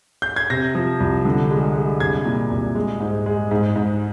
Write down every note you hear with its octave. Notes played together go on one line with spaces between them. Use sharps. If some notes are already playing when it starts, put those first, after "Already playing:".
G6
G#6
C3 A#6
F3
C2
D3
G#3
G#3
C2 G#6
A#2
C2
G#3
G#2
G#3
G#2
G#2